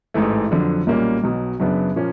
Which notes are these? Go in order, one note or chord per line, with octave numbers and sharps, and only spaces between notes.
A1 G#2 E3 A3
F2 D3 F#3
B1 A#2 G3 A#3 C#4
B1 B2 F#3
F#2 C#3 F#3 B3 D4
A#2 F3 A#3 C#4